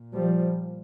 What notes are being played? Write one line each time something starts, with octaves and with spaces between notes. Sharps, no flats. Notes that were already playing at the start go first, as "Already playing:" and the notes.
Already playing: A#2
F3 G3